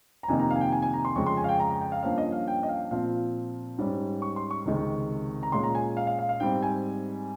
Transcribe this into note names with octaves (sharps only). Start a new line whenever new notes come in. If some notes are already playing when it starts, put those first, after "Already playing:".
A#5
F2 C3 D#3 A#3 D#4 G#5
A#5
F5
G#5
G5
G#5
G#5
A#5
C6
F2 C#3 G#3 C#6
C6
G#5
F5
G5
A#5
A#5
G5
F5
G2 F3 A#3 C#4 F5
D#5
F5
G5
D#5
F5
A#2 F3 C4 F4 F5
G#2 G3 C#4
C#6
C6
C#6
C#2 C3 D#3 G#3 C4
A#5
A#2 G#3 C#4 F4 C6
A#5
G#5
F5
F5
F5
F5
G#2 G3 C4 G5
G#5